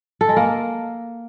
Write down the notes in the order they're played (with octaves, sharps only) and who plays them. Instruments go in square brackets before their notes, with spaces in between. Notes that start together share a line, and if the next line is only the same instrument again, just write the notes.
[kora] A4
G#3
A#3